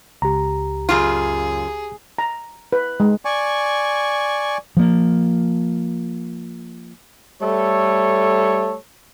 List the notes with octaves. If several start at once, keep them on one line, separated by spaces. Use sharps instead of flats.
C#2 G4 A#5
F#2 C#3 F4 G#4
A#5
B4
G#3
D5 G#5 C#6
F3 A#3
G3 A3 A4 C#5